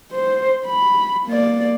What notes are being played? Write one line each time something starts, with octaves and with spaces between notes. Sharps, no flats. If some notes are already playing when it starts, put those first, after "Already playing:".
C5
B5
A#3 D5